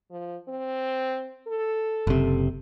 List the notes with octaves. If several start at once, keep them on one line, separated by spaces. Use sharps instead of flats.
F3
C4
A4
F#1 C3